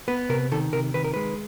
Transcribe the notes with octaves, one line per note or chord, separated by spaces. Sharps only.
B3 B4
C3 A#4
D#3 A4
C3 A#4
D#3 B4
A#4
G#3 B4